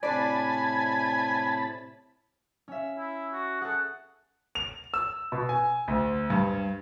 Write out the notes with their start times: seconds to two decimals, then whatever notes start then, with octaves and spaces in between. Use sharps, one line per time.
0.03 A2 C3 D4 D5 G#5 A5 B5
2.68 C#4 E5
2.98 E4
3.33 F#4
3.61 G#4 A4 F#5
4.55 F7
4.94 E6
5.32 B2
5.49 G#5
5.88 D2
6.30 G2